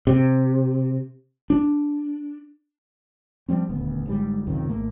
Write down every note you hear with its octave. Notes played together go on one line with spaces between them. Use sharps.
C3
D4
F3 G3 C4
D#1 D2 B3
G1 G#2 G3
C#2 F#2 C3 D#3
G#1 G#2 A3 A#3